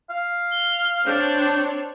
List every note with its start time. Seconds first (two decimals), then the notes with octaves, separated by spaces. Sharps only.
0.10 F5
0.52 G7
1.06 C4 D4 C#5 G6